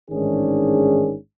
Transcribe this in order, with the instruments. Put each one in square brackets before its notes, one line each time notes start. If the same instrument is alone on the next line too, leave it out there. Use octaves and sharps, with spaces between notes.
[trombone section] A1 G#2 D#3 C#4 D4 G#4